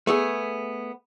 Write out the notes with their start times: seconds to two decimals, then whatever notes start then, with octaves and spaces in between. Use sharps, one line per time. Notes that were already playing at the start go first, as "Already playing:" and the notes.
0.07 A3 B3 G#4